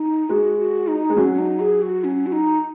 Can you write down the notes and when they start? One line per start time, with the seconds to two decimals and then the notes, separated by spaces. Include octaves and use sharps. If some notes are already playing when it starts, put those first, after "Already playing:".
Already playing: D#4
0.29 G#3 F#4
0.59 F#4
0.87 D#4
1.10 G#3
1.16 F#3 C#4
1.34 C#4
1.39 D#4
1.60 G#4
1.82 F#4
2.04 C#4
2.26 F#4
2.32 D#4